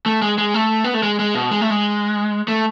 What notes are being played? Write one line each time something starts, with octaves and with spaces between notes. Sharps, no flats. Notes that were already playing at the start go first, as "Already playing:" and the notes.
A3
G#3
G#3
A3
B3
A3
G#3
G#3
B2
G#3
A3
G#3
A3